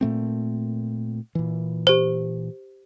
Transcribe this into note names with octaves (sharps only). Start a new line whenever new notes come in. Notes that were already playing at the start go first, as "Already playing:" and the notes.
A#2 A3 C4
A#2 E3
G4 C5